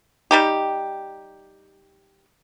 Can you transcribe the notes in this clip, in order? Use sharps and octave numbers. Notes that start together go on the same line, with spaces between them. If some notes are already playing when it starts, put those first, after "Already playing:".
G3 D#4 G4